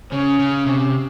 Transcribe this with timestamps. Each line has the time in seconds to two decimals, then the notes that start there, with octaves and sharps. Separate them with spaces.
0.12 C#3 C#4
0.39 C#3
0.66 C3